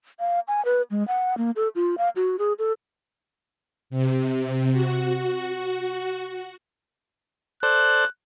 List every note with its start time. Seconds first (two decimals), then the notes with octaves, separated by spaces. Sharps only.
0.19 F5
0.48 G#5
0.65 B4
0.91 G#3
1.08 F#5
1.38 A#3
1.56 A4
1.75 F4
1.98 F5
2.16 F#4
2.39 G#4
2.59 A4
3.90 C3
4.72 F#4
7.63 A4 C5 D5 F#6